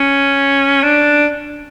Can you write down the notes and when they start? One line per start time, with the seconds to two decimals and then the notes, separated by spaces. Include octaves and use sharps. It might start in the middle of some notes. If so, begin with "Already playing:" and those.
Already playing: C#4
0.84 D4